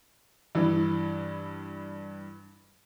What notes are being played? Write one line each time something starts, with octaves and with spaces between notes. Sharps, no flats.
G2 E3